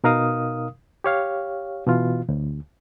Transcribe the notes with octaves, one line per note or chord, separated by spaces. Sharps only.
B2 D#4 A#4 F5 D#6
G4 C#5 F5
B2 E3 F4
D2